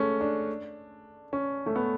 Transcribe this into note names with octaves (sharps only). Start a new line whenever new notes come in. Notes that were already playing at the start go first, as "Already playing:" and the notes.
Already playing: G#3 A3 C#4
D4
C#4
A3
B3